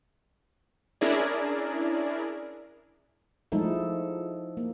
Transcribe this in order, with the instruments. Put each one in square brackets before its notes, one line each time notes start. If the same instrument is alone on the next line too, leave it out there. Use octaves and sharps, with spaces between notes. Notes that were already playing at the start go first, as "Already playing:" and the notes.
[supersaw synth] C#4 D4 E4 G#4 A#4 D5
[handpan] F3 G#3 A3 D#4 E4 A4
A#3